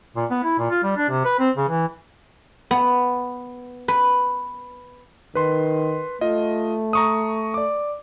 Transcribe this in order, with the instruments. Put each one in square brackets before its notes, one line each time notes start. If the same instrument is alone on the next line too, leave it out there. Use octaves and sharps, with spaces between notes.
[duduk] A#2
B3
E4
A#2
F4
G3
D4
C3
B4
C4
C#3
E3
[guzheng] B3
B4
[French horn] D#3 [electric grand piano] B4 C6
[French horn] A3 [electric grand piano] F4 D#5
[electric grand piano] A#5 C#6 D#6
D5 D6